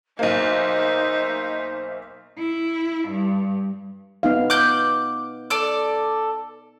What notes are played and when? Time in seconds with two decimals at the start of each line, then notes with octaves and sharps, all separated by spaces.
0.19 B1 A#3 D#4 C5 E5
2.39 E4
3.08 G2
4.23 B3 D#4 F5
4.50 D6 F#6 G6
5.50 A4 D5